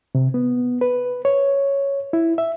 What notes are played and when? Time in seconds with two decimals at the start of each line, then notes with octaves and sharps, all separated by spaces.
0.15 C3
0.34 B3
0.81 B4
1.25 C#5
2.13 E4
2.38 E5